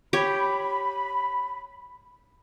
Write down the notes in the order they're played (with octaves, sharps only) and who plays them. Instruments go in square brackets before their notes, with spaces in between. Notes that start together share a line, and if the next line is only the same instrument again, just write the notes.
[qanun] G4 C#5 [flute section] B5